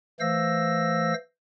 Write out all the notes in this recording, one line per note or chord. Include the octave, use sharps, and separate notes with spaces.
E3 A3 C5 F5 E6 A#6